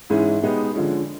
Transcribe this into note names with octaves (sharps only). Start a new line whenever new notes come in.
G#2 E3 G#3 C#4 E4
B2 G#3 B3 D#4 G4
D3 F3 G#3 C#4